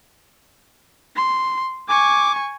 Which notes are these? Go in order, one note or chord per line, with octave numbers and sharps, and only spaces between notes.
C6
G#5 C#6 D6